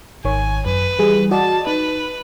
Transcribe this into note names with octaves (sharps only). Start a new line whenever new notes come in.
G#1 D#3 C#5 G#5
F#2 B4
E3 G3 G#4
F#4 D5 D#5 A5
D#4 B4